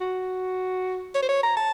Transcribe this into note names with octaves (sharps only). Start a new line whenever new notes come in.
F#4
C#5
C5
C#5
A#5
A5